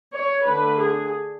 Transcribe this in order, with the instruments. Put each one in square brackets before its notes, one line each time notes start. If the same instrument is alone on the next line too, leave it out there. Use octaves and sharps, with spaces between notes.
[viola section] C#5
D3 A3 D4 B4
G#4